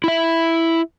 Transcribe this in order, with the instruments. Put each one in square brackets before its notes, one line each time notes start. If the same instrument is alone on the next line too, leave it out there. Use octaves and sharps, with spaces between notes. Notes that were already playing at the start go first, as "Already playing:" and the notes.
[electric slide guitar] E4 E5